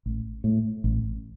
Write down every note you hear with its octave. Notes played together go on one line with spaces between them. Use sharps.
A1
A2
A1